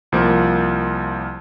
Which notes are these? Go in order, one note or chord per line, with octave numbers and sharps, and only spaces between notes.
C2 F3 A#3